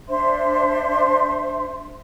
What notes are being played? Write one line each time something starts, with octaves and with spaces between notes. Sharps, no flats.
D4 C5 E5 C6